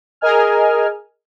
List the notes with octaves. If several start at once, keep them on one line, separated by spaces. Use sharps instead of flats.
G#4 A#4 D#5 G#5 F6